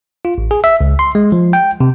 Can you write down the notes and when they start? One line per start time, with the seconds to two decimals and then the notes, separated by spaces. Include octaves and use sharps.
0.25 F4
0.38 A1
0.51 G#4
0.64 E5
0.81 C#2
0.99 C6
1.15 G#3
1.32 F3
1.53 G5
1.80 C3